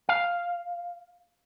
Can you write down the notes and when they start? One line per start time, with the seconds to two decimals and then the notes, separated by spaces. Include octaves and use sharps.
0.09 F5